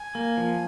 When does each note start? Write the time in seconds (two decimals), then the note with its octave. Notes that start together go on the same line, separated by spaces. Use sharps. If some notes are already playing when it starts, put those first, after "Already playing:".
Already playing: G#5
0.15 A#3
0.37 F3